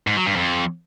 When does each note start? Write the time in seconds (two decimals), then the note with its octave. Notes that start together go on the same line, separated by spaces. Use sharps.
0.07 G#2
0.17 F#3
0.26 G2
0.36 F2